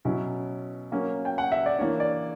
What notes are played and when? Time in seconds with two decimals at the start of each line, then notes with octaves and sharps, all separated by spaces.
0.05 B2 F#3 C#4 E4
0.92 F#3 A#3 C#4
1.25 G5
1.38 F#5
1.52 E5
1.66 D5
1.79 E3 A#3 D4 C#5
2.00 D5